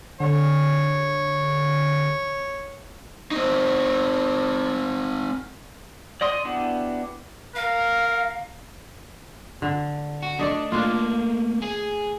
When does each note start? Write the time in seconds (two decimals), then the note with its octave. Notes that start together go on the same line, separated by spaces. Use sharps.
0.20 D3 C#5
3.31 C4 D#4
6.21 D5 D#5 C6 D#6
6.45 B3 D4 E4 F#4 G4
7.56 A#4 F5
9.62 D3
10.23 F#4
10.39 A3 D4 D5 D#5
10.72 A3 A#3 D4 F4
11.62 G#4 G#5